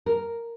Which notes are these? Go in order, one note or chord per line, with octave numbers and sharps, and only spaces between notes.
A#4